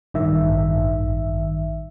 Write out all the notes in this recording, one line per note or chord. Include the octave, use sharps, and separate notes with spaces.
A1 G2 D#3 E5